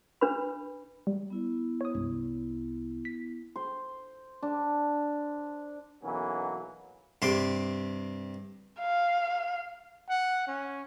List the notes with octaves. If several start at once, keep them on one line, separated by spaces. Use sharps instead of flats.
D4 B4 B5
G3
B3 E4
C#5 D#6
C2 G2
B6
C5
D4
B1 B2 E3 F#3 A#3 C#4
G2 C3 C6 D6
F5
F#5
C#4